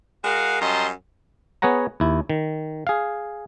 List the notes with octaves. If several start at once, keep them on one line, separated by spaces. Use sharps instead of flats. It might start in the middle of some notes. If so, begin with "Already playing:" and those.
G#3 F#4 A#4 F5 F#5
F#2 G3 D#5 A5 A#5 C6
B3 G#4 C#5 F#5 A#5
D#2 E4
D#3
G#4 F5